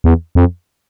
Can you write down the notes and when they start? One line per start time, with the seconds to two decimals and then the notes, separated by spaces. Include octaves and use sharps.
0.04 E2
0.35 F2